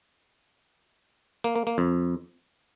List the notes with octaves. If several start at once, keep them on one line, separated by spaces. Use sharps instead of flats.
A#3
A#3
A#3
F2